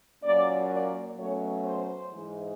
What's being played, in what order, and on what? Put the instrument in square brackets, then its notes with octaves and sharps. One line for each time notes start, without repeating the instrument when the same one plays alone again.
[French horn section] A#2 F#3 A#3 C#4 D5
D5
B2 F#3 A3 C#4 C#5
C5
G#2 E3 G#3